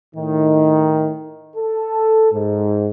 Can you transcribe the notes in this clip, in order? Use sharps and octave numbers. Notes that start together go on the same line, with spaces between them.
A2 D#3
A4
G#2